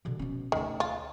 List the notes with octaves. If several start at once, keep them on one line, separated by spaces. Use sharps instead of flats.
B2 D3
B2 C#4
D2 D3 D#3
F4